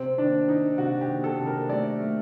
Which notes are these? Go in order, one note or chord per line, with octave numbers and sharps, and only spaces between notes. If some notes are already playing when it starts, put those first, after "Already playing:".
Already playing: C3 C4
D#3 D4
D#3 D#4
C3 F#4
G4
D#3
A4
C3
A#4
A3 D5
A3